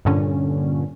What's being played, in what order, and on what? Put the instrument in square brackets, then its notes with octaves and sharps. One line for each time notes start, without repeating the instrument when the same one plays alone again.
[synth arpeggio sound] G2 A#2 D3 C#4